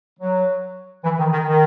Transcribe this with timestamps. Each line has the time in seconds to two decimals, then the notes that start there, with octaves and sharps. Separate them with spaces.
0.19 F#3
1.04 E3
1.18 D#3
1.32 D#3
1.47 D#3